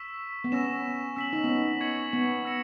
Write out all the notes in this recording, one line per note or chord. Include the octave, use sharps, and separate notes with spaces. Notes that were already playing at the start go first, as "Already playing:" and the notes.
Already playing: C#6 E6 B6 E7
B3
C#4 C#6 E6 A#6 E7
C#4 E6 B6 F#7
D#4
B3
C#4
C#6 G#6 C#7 F#7
B3
E6 A#6 C#7 E7